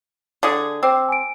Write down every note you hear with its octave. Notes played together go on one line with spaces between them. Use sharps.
D3 G#4
C4 G5 D6 E6
G#5 D7